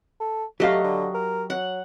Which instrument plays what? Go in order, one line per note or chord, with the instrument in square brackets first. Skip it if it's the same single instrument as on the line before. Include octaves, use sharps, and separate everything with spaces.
[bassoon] A4
[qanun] F#3 D#5 [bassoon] A3 [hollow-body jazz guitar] G4 F5
[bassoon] D3
A#4
[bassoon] F#3 [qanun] F#5